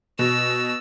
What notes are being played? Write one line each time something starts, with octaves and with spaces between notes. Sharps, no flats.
B2 E6